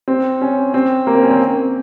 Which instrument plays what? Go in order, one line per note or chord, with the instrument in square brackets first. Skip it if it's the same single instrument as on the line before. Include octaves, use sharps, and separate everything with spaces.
[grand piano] C4
C#4
C4
A#3
C4
C#4
C4